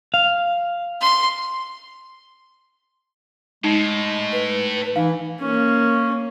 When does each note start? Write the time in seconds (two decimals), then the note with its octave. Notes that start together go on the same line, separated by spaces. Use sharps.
0.14 F5
1.01 C6
3.64 A2 G#3 D#4
4.32 B4
4.96 E3 D#4 F5
5.41 A#3 C#4